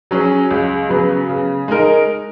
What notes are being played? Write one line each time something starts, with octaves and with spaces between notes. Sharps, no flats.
F#3 C#4 G#4
C#2
C#3 F#3 B3
C#3
G#3 D#4 A#4